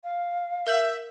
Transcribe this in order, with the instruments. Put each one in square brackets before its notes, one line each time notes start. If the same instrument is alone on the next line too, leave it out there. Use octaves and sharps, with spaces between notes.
[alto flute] F5
[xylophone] A#4 G6 F#7 [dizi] E5